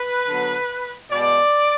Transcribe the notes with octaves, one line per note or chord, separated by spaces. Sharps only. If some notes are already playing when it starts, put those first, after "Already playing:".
Already playing: B4
D3 F#3 B3
B2 G#3 B3 D5